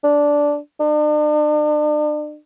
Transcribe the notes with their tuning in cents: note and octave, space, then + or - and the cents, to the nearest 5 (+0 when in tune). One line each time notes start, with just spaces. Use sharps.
D4 -10
D4 +40